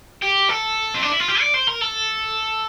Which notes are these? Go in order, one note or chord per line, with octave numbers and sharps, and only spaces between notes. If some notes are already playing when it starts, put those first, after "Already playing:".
G4
A4
C4
D4
E4
F4
G4
D5
C5
A#4
A4